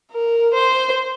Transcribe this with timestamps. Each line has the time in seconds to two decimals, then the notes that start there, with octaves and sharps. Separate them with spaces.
0.12 A#4
0.54 C5